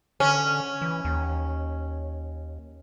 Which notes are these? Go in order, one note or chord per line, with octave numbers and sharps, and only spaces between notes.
D3 C#4
E3
D#2